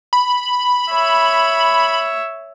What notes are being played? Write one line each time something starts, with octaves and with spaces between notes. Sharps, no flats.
B5
C#5 E5